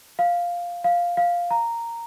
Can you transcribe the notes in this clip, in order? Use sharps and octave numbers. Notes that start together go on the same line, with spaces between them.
F5
F5
F5
A#5